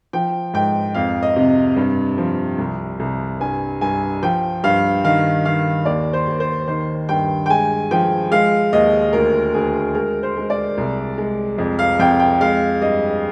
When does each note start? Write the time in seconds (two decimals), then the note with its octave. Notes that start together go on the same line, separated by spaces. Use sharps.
0.13 F3 G5
0.54 G#2 G5
0.95 F2 F5
1.23 D#5
1.36 C3
1.76 G2
2.18 F3
2.58 C2
3.00 C2
3.40 G2 G#5
3.81 G2 G#5
4.23 F3 G5
4.64 G2 F5
5.04 D#3 F5
5.45 D#3 F5
5.85 D#2 D5
6.13 C5
6.28 D#2
6.40 C5
6.68 D#3 C5
7.09 G2 G5
7.46 G5
7.49 G#3 G#5
7.91 F3 G5
8.31 G#3 F5
8.73 D#2 D#5
9.13 D2 A#4
9.54 D2 G#4
9.95 G#3 A#4
10.23 C5
10.37 G#3
10.50 D5
10.78 C2
11.18 G#3
11.58 F2
11.79 F5
11.99 F2 G5
12.20 G5
12.41 G#3 F5
12.81 G2 D#5